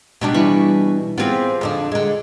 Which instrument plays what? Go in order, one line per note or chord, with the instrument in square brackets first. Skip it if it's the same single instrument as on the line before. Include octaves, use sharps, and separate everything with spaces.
[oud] B2 G3 D4
[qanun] E3 B5 C#6
[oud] B3 C4 [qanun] F4 G4 G#4
[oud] F2 D3 D4
D3 G#3